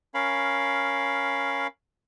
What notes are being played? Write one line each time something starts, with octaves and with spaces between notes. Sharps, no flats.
C#4 A#4 F5 B5